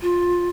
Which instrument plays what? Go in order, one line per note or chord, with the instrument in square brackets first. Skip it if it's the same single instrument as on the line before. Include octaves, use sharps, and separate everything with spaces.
[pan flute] F4